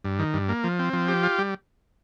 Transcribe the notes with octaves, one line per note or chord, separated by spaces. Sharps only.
G2
D#3
G2
A#3
F3
C4
F3
G4
F4
G3